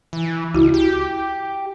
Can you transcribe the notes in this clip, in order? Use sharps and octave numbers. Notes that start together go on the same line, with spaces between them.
E3
C#2 E4 F#4
G4